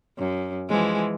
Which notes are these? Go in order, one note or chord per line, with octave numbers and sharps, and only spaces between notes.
F#2
E3 F3 G#3